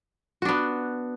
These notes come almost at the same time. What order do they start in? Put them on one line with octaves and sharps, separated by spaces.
F#4 D4 B3